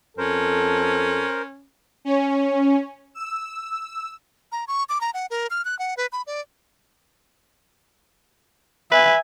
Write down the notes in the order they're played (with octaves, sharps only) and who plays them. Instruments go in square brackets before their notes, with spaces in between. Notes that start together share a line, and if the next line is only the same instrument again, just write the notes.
[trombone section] F2 A4 [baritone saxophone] C#4 [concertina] A#4 C5
[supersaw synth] C#4
E6
[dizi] A#5
C#6
D6
A#5
F#5
A#4
F6
F#6
F#5
B4
B5
D5
[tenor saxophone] B4 [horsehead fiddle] E5 G#5